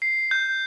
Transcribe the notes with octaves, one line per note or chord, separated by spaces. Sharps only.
C7
G6